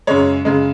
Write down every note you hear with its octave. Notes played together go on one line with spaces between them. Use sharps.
F#2 C#3 G#3 C#5
F#2 C#3 G#3